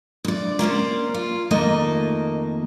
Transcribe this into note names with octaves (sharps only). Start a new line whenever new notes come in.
D2 D5
A#3 C#4 C5 D5
F4
F2 D#3 A3 A#3 D#5